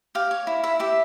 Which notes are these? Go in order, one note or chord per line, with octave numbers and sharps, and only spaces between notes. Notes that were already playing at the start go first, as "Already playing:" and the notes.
G4 F5
C#5
E4
E4 E5
G4 E5